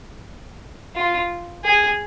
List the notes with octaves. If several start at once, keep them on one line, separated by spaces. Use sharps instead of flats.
F4
G#4